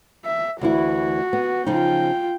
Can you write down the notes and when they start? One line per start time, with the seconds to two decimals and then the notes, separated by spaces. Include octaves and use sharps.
0.25 E5
0.61 D2 E3 E4 F#4
1.33 B3
1.66 C#3 F3 D#4 F4 G5